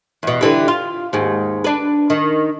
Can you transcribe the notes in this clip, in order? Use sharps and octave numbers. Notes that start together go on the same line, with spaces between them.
E2 B2
D3 E3 G3
F4
D#2 G#2
D4 B4
D#3